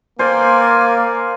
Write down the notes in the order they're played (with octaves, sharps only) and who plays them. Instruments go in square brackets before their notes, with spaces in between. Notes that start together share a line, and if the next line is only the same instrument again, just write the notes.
[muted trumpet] A#3 [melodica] A#4 D5 G#5 [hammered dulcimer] C5